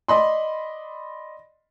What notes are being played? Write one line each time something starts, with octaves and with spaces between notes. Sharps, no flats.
D5 D#5 B5 C6